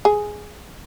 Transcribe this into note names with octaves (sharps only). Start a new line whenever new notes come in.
G#4